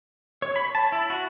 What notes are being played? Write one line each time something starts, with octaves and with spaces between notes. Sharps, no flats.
C#5
B5
A5
E4
F#4